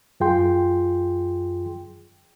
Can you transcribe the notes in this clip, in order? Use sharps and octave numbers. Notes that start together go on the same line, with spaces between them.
F#2 F4 G#4 G5 C6